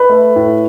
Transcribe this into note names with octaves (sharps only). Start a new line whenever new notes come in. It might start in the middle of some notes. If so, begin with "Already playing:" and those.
Already playing: B4 B5
A3
A2